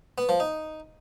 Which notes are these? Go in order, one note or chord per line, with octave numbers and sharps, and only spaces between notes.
B3
F3
D#4